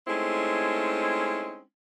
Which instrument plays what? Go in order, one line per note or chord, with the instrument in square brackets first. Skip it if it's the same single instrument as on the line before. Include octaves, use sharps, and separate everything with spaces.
[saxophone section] G#3 A3 C4 C#4 D#4 E4